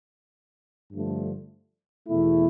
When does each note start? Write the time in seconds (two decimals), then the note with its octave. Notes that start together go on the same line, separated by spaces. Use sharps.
0.91 G2 D3 F3 A3
2.07 E2 B2 A3 E4